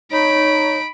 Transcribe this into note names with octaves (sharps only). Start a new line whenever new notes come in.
D#4 C#5 B5 D7